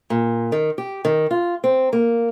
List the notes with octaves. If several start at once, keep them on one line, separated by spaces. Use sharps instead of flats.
A#2
D#3
G4
D#3
F4
C4
A#3